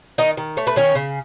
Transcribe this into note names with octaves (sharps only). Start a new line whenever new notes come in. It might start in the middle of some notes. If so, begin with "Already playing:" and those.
D#3 D#4 D#5
D#3
A3 C#5
B4
D#3 C#4 C#5
C#3